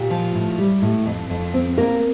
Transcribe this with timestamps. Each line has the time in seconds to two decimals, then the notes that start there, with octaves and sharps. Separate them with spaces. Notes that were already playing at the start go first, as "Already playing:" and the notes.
Already playing: A#2 G4
0.10 F3
0.35 A2
0.58 G3
0.82 A2
1.06 F2
1.30 F2
1.54 C4
1.78 A#3 A#4